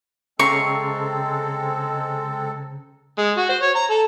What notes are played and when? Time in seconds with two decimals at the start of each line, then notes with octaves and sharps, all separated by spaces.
0.39 C#3 G#3 C4 A4 A#5 C#6 C7
3.18 G#3
3.38 F#4
3.49 C5
3.62 C#5
3.76 A#5
3.90 A4